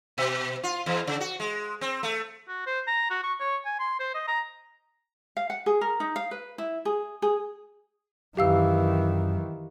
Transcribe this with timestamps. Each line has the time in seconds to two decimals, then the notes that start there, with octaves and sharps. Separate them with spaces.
0.18 B2
0.63 F4
0.86 E2
1.07 C#3
1.20 F#4
1.40 G#3
1.81 C4
2.03 A3
2.48 F#4
2.67 C5
2.87 A#5
3.10 F#4
3.23 C#6
3.40 C#5
3.65 G#5
3.79 C6
4.00 C5
4.14 D#5
4.28 A#5
5.37 F5
5.50 F#5
5.66 G#4
5.81 A#4
6.00 D#4
6.16 F5
6.31 B4
6.58 E4
6.85 G#4
7.22 G#4
8.37 F#2 D#3 E3 G4 F5 E6